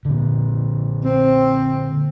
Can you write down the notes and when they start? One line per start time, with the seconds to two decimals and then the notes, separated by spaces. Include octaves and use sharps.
0.05 A#2 D3
1.04 C4